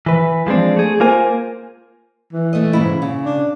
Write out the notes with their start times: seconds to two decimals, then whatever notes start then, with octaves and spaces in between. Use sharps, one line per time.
0.06 E3 B4
0.47 F3 G#3 C4 D4
0.77 A3 G#4
1.00 A#3 F4 A#4 C5 G#5
2.32 E3
2.53 A3 D#5
2.73 G#2 C#3 E4
3.02 C#3
3.25 D4